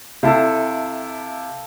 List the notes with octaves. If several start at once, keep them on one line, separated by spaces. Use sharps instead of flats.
C3 E4 A4 F5